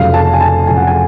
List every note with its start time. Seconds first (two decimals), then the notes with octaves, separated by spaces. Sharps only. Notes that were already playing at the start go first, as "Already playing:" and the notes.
Already playing: F1 F2 C#3 F#3 F5
0.14 A5
0.34 G#5
0.41 A5
0.67 F1 F2 C#3 F#3 G#5
0.77 F#5
0.87 G#5